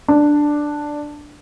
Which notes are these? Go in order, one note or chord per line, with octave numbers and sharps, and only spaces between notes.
D4